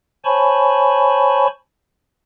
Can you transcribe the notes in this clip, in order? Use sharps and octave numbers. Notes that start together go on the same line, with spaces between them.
C5 C#5 G#5 A5 B5 C#6